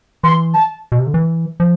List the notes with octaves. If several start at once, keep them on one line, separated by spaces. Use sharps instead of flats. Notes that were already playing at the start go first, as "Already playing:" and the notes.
E3 C6
A5
B2
C3
D3
E3
F3